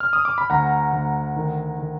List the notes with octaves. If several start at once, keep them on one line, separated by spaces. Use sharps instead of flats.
F6
D#6
D6
B5
D2 F#5 A#5
D2
D#3
D#3